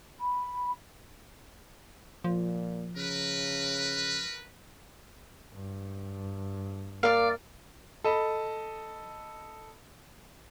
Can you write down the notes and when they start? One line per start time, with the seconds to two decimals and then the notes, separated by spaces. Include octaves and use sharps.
0.20 B5
2.24 A#2 F3
2.97 C#3 A#4 B4
5.53 G2
7.03 A#3 D5 F5
8.04 A4 D#5 B5